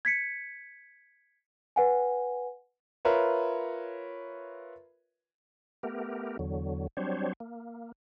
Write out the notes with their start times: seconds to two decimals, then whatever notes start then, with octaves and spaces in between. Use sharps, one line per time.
0.05 G#6 B6 C#7
1.76 B4 F#5 G#5
3.05 F4 A#4 B4 C#5 E5
5.83 A3 B3 G4 A#4
6.39 E2 D3 F#3
6.97 F#3 G3 C4 D4 C5 C#5
7.40 A#3